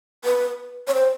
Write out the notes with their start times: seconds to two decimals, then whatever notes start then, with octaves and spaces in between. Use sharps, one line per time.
0.25 B4
0.88 C#5
0.94 C5